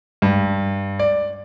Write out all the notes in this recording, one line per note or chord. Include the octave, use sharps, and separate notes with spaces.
G2
D5